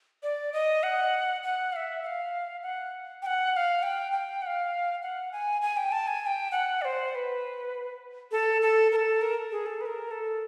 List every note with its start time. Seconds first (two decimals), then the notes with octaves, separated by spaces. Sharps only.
0.23 D5
0.53 D#5
0.83 F#5
1.43 F#5
1.73 F5
1.76 E5
2.03 F#5
2.06 F5
2.63 F#5
3.22 G5
3.26 F#5
3.52 F#5
3.56 F5
3.83 G5
4.12 G5
4.42 F#5
4.46 F5
5.03 F#5
5.32 G#5
5.62 G#5
5.77 G5
5.92 A5
6.07 G#5
6.22 G#5
6.26 G5
6.52 F#5
6.82 D5
6.85 C5
7.12 C5
7.15 B4
8.31 A4
8.62 A4
8.92 A#4
8.96 A4
9.22 A#4
9.51 G#4
9.66 A4
9.81 B4
9.86 A#4
10.11 A4